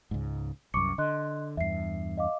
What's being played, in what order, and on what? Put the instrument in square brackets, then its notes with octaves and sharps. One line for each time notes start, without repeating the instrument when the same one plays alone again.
[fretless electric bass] C#2 G#2
[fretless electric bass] C2 F#2 [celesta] C#6 D6 C#7
[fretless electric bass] D3 [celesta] D#5 C6 F#6
[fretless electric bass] E2 G2 [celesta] E5 C7
[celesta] D#5 F5 D6